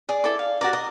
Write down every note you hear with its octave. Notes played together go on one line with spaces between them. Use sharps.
G#4 D5
E4 A4 D6
F5
F#4 G4 A#4 D5 D6
A#4 D#5